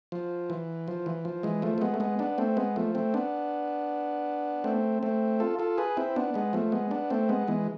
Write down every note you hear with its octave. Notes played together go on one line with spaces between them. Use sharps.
F3
E3
F3
E3
F3
E3 G#3
F3 A3
A3
G#3 B3
A3
G#3 B3
B3 D4
A3 C4
G#3 B3
F3 A3
A3 C4
B3 D4
A3 C4
A3 C4
F4 A4
F4 A4
G#4 B4
C4 E4
B3 D4
G#3 B3
F3 A3
G#3 B3
B3 D4
A3 C4
G#3 B3
E3 G#3